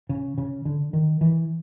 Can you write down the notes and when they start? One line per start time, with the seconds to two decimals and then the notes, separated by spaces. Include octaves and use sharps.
0.09 C#3
0.38 C#3
0.65 D3
0.93 D#3
1.21 E3